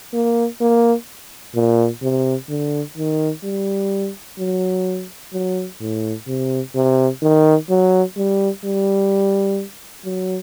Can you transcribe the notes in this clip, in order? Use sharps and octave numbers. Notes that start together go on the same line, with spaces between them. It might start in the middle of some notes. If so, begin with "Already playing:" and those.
A#3
A#3
A#2
C3
D3
D#3
G3
F#3
F#3
A2
C3
C3
D#3
F#3
G3
G3
F#3